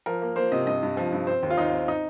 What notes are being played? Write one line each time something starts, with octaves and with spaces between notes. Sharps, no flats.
F3 A#4
A#3
A#3 C5
C3 D#5
G2 D#5
G2
F3
G2
C4 C5
D#2
F4
D#2 D#4
C4
D#4